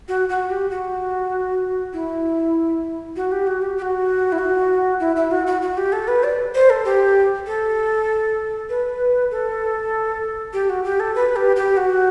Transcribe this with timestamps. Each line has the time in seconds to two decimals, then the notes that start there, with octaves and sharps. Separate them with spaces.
0.08 F#4
0.29 F#4
0.50 G4
0.70 F#4
1.93 E4
3.16 F#4
3.32 G4
3.47 F#4
3.62 G4
3.77 G4
3.82 F#4
4.32 E4
4.38 F#4
5.00 E4
5.16 E4
5.31 F#4
5.47 F#4
5.62 F#4
5.77 G4
5.92 A4
6.08 B4
6.24 D5
6.55 C5
6.70 A4
6.85 G4
7.46 A4
8.69 B4
9.31 A4
10.53 G4
10.69 F#4
10.84 G4
11.00 A4
11.15 B4
11.36 G4
11.56 G4
11.77 F#4